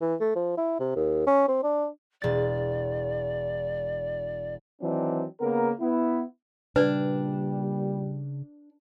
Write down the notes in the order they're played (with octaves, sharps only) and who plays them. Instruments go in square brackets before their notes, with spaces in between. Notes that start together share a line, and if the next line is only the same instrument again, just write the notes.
[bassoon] E3
A3
F3
E4
C3
D#2
C#4
C4
D4
[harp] E1 A6 [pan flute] D5
[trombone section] D#3 E3 F#3 C4 D4 D#4
C#3 A#3 B3 A#4
B3 E4
[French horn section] A#2 G3 [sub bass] C#3 [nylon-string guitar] D4 [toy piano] B4 D5